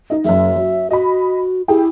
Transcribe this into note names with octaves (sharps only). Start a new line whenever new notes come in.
D#4 D#5
F#1 F#2 E5
F#3
F#4 D#5 B5
E4 G4 G#4 G5